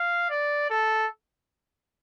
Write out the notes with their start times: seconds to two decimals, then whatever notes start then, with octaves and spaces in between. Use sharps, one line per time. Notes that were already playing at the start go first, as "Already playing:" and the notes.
Already playing: F5
0.30 D5
0.70 A4